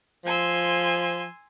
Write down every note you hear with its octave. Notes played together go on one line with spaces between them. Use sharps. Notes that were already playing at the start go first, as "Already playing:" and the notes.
F3 G#5 C6 E6